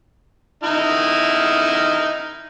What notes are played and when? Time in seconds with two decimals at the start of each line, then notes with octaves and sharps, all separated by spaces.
0.64 D#4 E4 F6